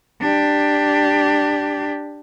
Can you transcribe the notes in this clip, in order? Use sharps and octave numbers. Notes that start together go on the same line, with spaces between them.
D4 G4